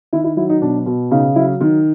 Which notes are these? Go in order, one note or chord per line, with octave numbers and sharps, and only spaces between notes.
D#3 E4
E4
F#3 E4
D#4
B2 D4
B2
C#3 D#4
F#3 E4
D#3